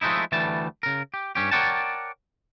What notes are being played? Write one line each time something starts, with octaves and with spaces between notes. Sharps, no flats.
F3 G#3 A3 D#4 E4
D2 E3 G3 A3 A5
C#3 A#4
G4
G2 C#4 G4
A#4 C#5 D5 F#5 G5 A5